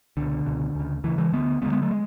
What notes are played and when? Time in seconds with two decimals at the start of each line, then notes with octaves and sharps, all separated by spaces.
0.17 C#2 B2 D3
0.46 C#2 B2
0.75 D2 C#3
1.04 D2 C#3 E3
1.18 E3 G#3
1.33 D2 D3 G#3 B3
1.62 D2 G#3 B3
1.66 D3
1.72 G#3 B3
1.82 F#3 A3
1.91 G#3